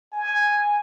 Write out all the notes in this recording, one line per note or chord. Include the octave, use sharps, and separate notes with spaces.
G#5